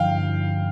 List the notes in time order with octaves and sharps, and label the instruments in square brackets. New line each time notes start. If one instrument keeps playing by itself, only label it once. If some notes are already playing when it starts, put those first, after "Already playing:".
Already playing: [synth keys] G2 D3 F3 [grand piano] F5 G5